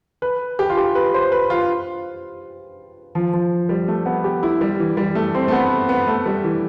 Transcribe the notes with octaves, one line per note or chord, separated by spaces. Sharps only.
B4
G4
F4
G4
B4
C5
B4
F4
F3
F3
G3
A3
B3
G4
E4
G3
E3
G3
A3
C4
A3
B3
B3
A3
G3
E3